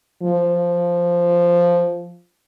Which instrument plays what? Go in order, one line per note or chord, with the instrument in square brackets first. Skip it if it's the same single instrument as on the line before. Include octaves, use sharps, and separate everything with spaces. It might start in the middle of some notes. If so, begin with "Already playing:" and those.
[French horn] F3